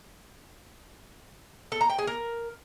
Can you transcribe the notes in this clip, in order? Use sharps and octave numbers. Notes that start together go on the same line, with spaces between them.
A4
A#5
G5
G#4
A#4